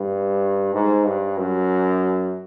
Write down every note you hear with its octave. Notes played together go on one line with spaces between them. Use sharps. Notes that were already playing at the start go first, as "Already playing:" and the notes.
Already playing: G2
G#2
G2
F#2